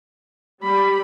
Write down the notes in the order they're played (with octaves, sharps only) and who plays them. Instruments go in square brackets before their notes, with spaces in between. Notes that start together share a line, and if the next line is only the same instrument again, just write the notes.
[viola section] G3 [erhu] B5